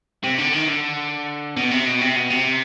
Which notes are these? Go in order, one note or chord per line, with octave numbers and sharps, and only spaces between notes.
C3
D3
D#3
D3
B2
C3
B2
C3
B2
C3